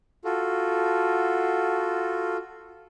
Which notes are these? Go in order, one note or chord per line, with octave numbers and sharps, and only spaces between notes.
F4 F#4 A4